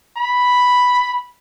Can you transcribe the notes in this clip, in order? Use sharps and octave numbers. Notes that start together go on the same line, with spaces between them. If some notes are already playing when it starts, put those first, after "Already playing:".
B5